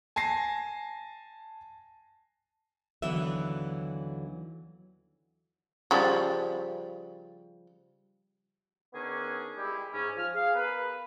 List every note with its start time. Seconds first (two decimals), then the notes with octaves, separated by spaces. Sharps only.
0.16 G#5 A5 A#6 C7
3.02 D#2 D3 E3 F#3 B3 E5
5.91 C#3 F3 G3
8.93 D#3 B3 C#4 D4 G#4
9.58 G3 G#3 E4 G4
9.92 G#2 C#4
10.17 F3 F6
10.34 G#4 F5
10.55 B3 A#4 B4